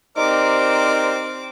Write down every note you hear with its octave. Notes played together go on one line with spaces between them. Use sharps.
C4 D#4 G4 A#4 C5 D5 D6